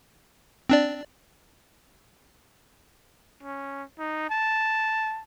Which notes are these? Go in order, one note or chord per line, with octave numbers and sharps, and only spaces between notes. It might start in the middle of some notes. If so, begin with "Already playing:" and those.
C4 D4 D5
C#4
D#4
A5